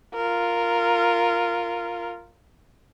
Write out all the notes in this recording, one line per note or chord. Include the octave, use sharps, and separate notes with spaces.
F4 A#4